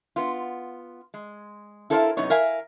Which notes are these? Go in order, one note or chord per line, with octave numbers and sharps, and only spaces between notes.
B3 F4
G#3
E4 A4 A#4 C5 D#5 F5
F#2 C3 B3 D#4 C#5
A#4 E5 F5 G#5